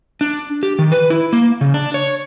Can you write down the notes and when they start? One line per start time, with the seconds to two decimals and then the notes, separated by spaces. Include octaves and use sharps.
0.21 D4
0.63 G4
0.79 D#3
0.92 B4
1.10 E4
1.33 A#3
1.61 C#3
1.74 D4
1.94 C#5